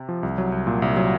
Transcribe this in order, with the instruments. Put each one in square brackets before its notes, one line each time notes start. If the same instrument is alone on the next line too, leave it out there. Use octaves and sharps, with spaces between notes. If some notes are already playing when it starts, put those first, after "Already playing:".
Already playing: [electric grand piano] C3
F3
C2
F#3
C2
A#2
C2
F#3